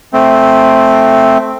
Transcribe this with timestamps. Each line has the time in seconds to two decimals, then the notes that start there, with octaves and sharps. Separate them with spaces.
0.13 A3 C4